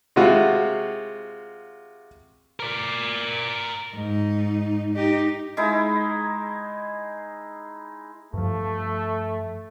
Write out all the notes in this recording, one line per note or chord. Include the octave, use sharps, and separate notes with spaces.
C3 G#3 F4 F#4
A#4 D5
G#2 D#4
D#4 G4
G#3 D#4 E4
G2 F3 A3